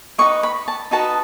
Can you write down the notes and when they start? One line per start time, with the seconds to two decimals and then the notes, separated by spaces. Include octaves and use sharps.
0.18 D#4 F#4 B4 D#5 C#6
0.43 B5
0.68 A5
0.91 D#4 F#4 B4 D#5 A5